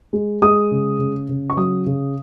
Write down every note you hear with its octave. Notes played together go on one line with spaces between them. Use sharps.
G#3
G#3 D#6
C#3
C#3
C#3
C#6
F#3 D#6
C#3